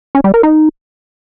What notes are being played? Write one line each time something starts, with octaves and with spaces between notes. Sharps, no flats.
C#4
G3
A#4
D#4